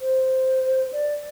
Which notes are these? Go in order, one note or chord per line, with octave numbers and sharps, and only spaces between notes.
C5
D5